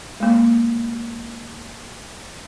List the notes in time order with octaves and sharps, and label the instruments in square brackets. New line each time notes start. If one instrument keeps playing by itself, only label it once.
[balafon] G#3 A#3